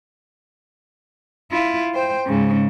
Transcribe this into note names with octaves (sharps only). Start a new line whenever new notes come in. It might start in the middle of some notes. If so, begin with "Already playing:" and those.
E4 F4
C5 G5
G#2 C#3